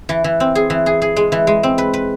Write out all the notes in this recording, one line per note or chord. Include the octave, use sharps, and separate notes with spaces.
E3
E3
C4
G#4
E3
G#4
G#4
G#3
E3
G#3
C4
B4
B4